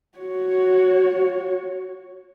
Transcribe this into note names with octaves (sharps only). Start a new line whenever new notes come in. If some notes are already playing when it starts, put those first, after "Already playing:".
F#4 C#5